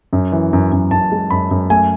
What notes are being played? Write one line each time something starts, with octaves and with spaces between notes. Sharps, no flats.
F#2
E3
F#2
F#2
F#2 A5
G#3
F#2 B5
F#2
A3 G#5